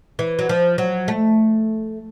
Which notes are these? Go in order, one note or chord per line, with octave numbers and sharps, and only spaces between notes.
E3
F#3
F3
F#3
A3